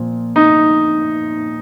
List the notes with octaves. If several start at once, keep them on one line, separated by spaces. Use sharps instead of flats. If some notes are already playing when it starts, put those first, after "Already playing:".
Already playing: A#2 F3
D#4